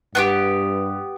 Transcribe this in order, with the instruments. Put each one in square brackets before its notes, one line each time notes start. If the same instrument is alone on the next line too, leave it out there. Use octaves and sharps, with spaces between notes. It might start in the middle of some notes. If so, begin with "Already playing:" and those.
[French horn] G2 [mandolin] B3 F4 G4